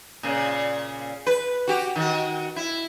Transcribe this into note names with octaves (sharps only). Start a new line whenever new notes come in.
A#2 C#3
B4
F#4 G4
D#3 F#4
E4